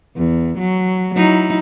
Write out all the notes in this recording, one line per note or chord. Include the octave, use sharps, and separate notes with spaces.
E2
F#3
F#3 D#4 E4